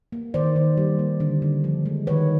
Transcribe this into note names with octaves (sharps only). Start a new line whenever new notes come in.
A#3
D#3 C5 D5
D#3
G3
A#3
D3
D3
F3
G#3
D#3 B4 C#5